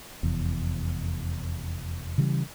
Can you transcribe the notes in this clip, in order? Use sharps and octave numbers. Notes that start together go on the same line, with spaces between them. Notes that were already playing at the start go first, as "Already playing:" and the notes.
F1 E2
C#3 E3 G3